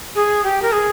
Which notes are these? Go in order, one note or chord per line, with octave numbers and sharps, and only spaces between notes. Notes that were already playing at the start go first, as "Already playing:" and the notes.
G#4
G4
A#4
G#4